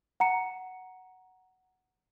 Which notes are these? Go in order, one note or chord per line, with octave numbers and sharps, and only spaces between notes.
F#5 A#5 C#7